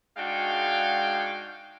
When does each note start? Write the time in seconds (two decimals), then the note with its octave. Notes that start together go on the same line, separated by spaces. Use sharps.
0.16 G#2 G#3 D4 F#4 F5 G5